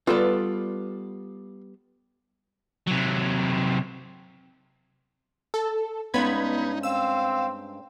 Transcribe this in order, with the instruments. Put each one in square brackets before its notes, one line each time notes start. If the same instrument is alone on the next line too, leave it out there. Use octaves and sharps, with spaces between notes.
[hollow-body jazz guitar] G3 B3 [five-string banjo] F4 A4 B4
[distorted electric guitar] C3 F#3
[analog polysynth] A4
[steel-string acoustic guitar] G2 G#3 C#4 [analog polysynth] B3 B5 G#6 [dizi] D#4
[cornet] C4 [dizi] F5 [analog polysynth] E6